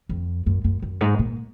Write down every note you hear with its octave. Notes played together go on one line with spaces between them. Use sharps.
F2
F#2
F#2
F#2
G#2
A#2